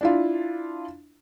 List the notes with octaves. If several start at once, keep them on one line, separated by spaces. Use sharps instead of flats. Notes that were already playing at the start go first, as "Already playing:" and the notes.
D4 E4 F4